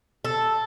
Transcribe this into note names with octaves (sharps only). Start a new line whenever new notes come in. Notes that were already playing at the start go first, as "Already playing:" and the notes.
A4